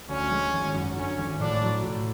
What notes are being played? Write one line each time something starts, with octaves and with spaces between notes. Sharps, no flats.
D2 C#4
G#3
G#1
F#2
D3 C#4
G#1
A2 D4
F#3
A2